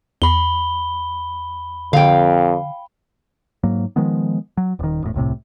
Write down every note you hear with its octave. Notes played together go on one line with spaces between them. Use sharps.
E2 B5 G7
F2 D3 F5 G5
G#2 F#3 A#3
D#3 F3 G#3 B3
F#3
D#1 D#3
E1 A2
D#1 C2 A2 C3